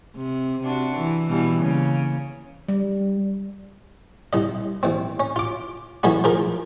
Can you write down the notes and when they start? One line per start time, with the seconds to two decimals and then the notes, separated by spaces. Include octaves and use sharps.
0.16 C3
0.62 C3 D4 F#4
0.96 E3
1.29 B2 E3 G3
1.60 C#3 A#3
2.69 G3
4.33 C2 D#5
4.83 A1 C4
5.20 C#4
5.36 F4 D6
6.03 E3 F#3 A3 C#4 F#4
6.24 F3 F4 G#4 A#4